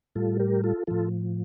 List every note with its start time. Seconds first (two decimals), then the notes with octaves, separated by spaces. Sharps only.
0.15 A2 G3 F4 A4
0.39 G4 A#4
0.63 F4 A4
0.87 A2 F3 F4 A4